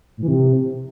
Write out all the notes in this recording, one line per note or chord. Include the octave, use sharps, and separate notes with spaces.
A2
E3
C3